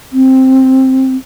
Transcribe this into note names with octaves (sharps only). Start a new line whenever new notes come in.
C4